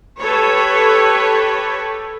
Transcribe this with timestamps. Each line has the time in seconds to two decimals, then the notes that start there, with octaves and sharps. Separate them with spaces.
0.21 G4 A4 B4 C#5